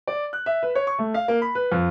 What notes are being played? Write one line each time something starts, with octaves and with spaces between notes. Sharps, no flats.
D5
F#6
E5
B4
C#5
C#6
A3
F5
A#3
B5
B4
F2